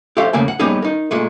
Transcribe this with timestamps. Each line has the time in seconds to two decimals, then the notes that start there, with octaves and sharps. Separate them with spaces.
0.17 G4 A4 C5 C#5 E5 F5
0.33 E2 C#3 A3 A#3 G#5
0.48 F#5
0.59 G3 A#3 B3 C#4 D#4 G#4
0.82 D#4 A#4
1.11 A#2 G#3 A3